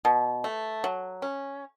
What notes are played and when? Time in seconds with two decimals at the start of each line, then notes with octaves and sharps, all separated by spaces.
0.05 B2
0.44 A3
0.84 F#3
1.22 C#4